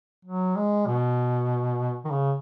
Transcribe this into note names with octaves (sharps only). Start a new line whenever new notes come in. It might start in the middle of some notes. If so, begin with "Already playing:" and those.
F#3
G#3
B2
D#3
C#3